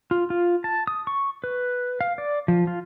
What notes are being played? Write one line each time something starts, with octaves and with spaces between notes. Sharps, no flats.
F4
F4
A5
D#6
C#6
B4
F5
D5
F3
F4